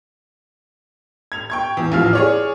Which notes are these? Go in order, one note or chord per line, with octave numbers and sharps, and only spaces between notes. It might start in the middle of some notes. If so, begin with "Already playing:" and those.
G#6 F7
G5 C#6 G#6
E2
A1 E2 F3 F5 F6
G#4 C#5 D5